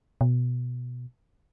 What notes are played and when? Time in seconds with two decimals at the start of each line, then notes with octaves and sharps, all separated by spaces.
0.21 B2